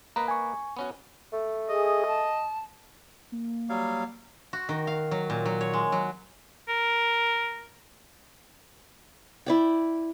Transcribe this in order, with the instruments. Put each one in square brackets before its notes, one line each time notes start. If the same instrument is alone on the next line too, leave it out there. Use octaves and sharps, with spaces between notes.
[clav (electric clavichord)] A#3 B4 D#5 [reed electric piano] A#5
[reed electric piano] G#5 C#6
[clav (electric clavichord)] B3 C#4 F#4
[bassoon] A3
[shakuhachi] G#4 [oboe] D#5
[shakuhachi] A5
[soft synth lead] A#3
[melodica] F#3 G3 F5
[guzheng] F#4
D#3
F5
F#3
A#2
F#3
C#5
G#3
F#3
[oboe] A#4
[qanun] E4 D5 G5